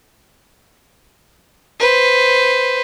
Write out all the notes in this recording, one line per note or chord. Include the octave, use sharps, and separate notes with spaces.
B4 C5